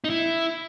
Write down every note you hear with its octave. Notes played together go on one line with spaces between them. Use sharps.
D#4
E4